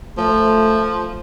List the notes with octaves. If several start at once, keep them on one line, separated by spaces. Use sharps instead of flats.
F3 A3